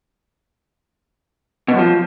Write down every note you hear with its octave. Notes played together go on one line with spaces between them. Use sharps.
B2
F#2
F3